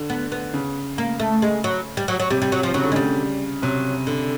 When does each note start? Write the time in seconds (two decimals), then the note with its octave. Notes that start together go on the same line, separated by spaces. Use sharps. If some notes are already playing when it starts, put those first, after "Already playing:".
Already playing: D3
0.10 B3
0.32 B3
0.54 C#3
0.98 A#3
1.20 A3
1.42 G#3
1.64 F#3
1.97 G3
2.08 F#3
2.20 F#3
2.30 C3 G3
2.42 G3
2.52 F#3
2.63 F3
2.74 C#3 F#3
2.83 D3
2.92 C#3 G3 G#3
3.62 C3 F#3
4.07 D3